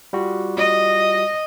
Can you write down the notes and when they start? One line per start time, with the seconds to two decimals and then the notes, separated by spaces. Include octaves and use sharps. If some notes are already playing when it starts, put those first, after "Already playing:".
0.13 G3 F4 F#4
0.57 D#5